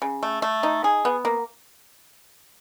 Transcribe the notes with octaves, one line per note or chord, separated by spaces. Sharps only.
C#3
A3
A3
D#4
G#4
B3
A#3